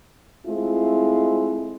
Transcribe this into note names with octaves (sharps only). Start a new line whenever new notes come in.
G#3 A3 C4 E4 F4